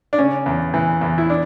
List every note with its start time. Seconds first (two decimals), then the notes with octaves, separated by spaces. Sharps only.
0.13 D4
0.18 C#3 C#4
0.46 E2
0.74 E3
1.01 E2
1.18 E4
1.30 D4